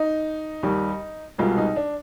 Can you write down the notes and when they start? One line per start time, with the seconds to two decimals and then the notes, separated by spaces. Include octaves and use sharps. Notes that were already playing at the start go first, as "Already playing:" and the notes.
Already playing: D#4
0.63 D#2 D#3 G3
1.38 C2 B2 G#3 F4
1.58 D#4
1.76 D4